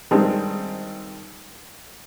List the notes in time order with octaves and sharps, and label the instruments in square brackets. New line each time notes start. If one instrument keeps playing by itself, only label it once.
[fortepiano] G#1 G2 D#3 G#3 C4